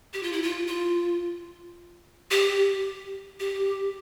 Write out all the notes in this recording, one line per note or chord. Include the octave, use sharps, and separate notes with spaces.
G4
F4
E4
F4
F4
G4
G4